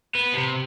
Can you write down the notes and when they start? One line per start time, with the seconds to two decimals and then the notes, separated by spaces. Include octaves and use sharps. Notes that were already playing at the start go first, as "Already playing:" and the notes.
0.15 B3
0.34 C3